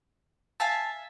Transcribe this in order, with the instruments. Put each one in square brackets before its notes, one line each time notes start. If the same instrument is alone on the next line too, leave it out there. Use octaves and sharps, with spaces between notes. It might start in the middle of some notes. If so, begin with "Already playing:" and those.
[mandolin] E5 F5 G#5 [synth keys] A5